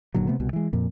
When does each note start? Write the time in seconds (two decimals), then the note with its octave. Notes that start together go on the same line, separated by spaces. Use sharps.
0.14 F#1 A#2 D3 F#3
0.27 C3 A3 B3
0.40 C2 B2
0.53 E3 G#3
0.73 F2 A#2